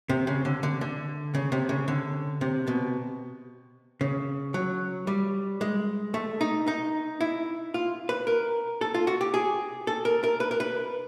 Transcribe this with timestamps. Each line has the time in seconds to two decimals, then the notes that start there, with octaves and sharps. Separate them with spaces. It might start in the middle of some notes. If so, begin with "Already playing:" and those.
0.09 C3
0.27 C#3
0.45 D3
0.63 D3
0.81 D3
1.35 C#3
1.52 C3
1.69 C#3
1.88 D3
2.41 C3
2.67 B2
4.01 C#3
4.54 F#3
5.07 G3
5.61 G#3
6.14 A3
6.41 D#4
6.68 D#4
7.21 E4
7.74 F4
8.09 B4
8.27 A#4
8.81 A4
8.94 F4
9.07 F#4
9.21 G4
9.34 G#4
9.87 A4
10.05 A#4
10.24 A#4
10.40 B4
10.51 A#4
10.60 B4